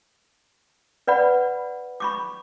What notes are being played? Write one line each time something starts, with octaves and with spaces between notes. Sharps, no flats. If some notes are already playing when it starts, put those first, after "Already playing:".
B4 D5 F#5 B5
B5 C#6 D6